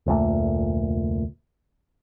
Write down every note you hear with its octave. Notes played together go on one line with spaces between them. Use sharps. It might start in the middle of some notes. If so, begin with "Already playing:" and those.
F1 D2 A#2 A3